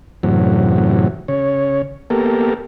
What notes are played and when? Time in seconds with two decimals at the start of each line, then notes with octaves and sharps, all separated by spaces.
0.23 F#2 A2 C3 E3 F#3
1.28 C#3 C#5
2.10 A#3 B3 G4 A4 A#4